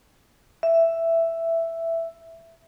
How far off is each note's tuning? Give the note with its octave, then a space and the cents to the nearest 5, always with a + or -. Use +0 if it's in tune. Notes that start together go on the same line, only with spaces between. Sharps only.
E5 +5